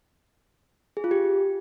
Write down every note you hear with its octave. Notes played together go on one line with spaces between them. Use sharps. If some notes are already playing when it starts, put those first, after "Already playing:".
G#4
F4
G4